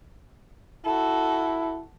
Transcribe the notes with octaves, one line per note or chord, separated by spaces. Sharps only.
E4 F#4 A4